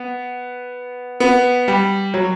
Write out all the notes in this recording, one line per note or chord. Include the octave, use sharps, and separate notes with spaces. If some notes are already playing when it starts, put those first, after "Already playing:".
Already playing: B3
B3
G3
F#3